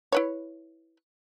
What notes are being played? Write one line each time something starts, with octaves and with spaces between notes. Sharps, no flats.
E4 B4 C#5